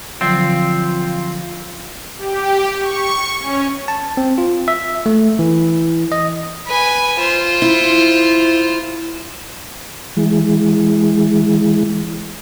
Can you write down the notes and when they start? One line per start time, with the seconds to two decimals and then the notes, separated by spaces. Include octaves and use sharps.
0.21 D3 F3 F#3 C4 F4
2.18 G4
2.78 C#6
3.39 C#4
3.88 A5
4.17 C4
4.38 F4
4.68 E5
5.06 A3
5.39 E3
6.12 D#5
6.66 B4 G#5
7.19 F4 C5
7.62 E4
10.17 E3 G#3